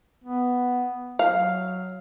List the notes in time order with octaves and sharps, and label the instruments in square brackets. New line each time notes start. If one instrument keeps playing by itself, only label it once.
[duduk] B3
[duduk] F#3 [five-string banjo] F5